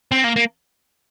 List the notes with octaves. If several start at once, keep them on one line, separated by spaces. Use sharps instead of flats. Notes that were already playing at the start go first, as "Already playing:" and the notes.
C4
A#3
A#3